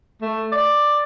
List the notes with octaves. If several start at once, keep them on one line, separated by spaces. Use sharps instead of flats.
A3
D5